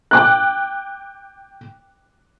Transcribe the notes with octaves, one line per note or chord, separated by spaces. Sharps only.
G5 D6 F#6